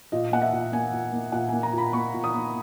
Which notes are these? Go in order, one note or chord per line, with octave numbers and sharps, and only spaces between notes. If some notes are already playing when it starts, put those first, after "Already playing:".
A#2 D#5
A#3 F#5
E5
A#2
A#3 G#5
A#2
A#3
A#2 F#5
A#3 G#5
A#5
A#2 B5
A#3 C#6
A#2
D#6
A#3